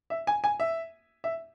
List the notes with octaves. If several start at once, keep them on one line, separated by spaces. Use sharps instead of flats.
E5
G#5
G#5
E5
E5